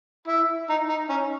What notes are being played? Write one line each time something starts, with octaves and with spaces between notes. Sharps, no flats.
E4
D#4
D#4
C#4